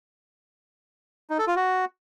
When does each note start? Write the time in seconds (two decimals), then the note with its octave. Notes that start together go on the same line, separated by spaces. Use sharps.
1.30 D#4
1.39 A4
1.47 F4
1.56 F#4